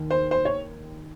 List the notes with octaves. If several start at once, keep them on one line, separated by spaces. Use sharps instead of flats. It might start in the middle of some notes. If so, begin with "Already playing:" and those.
Already playing: D#2 D#3
C5
C5
C#5